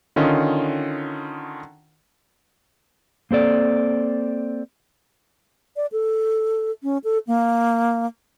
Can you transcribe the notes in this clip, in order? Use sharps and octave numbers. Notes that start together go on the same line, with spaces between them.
D3 D#3 C#4 F4 D#5
A#3 C4 A4 D5
D5
A4
C#4
A4
A#3